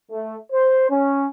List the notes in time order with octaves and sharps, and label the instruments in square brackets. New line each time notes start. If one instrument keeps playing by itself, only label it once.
[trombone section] A3
C5
C#4